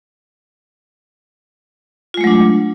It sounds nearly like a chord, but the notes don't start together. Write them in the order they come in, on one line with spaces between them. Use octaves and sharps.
F4 G#3 A3 F#3 D4